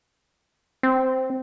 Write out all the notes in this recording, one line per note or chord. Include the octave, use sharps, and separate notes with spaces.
C4